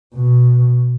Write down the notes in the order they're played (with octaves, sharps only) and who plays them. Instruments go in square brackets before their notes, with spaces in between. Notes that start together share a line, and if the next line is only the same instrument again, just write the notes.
[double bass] B2